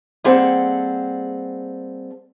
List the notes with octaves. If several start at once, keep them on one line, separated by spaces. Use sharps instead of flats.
G3 A#3 C4 G#4 A4 F#5